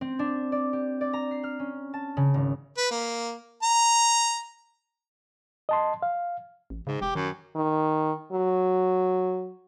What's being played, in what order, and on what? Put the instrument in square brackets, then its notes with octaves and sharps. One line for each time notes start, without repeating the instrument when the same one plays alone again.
[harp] C4
D4
D5
G4
D5
A#5
C7
F6
C#4
A5
C#3
G#1
[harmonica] B4
A#3
A#5
[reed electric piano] D#5 A5 C6
F5
[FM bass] A1
[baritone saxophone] G#2 [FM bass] C#3
[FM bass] E1 [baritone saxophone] G4
[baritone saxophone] F#2 [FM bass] D#3
[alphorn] D#3
F#3